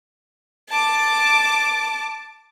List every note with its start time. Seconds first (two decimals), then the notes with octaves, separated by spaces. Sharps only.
0.69 A5 D6